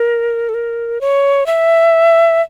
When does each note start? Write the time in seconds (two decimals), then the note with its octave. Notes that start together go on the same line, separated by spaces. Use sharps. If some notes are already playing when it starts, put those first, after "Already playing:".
Already playing: A#4
0.49 A4
0.54 A#4
1.01 C#5
1.46 E5